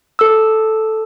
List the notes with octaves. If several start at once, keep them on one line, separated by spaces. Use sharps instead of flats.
A4 E6